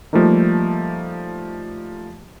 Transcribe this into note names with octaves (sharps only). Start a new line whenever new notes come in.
F3 G3 A3 A#3 D#4